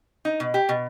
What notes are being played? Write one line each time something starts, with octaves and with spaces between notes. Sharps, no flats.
D#4
B2
G4
B2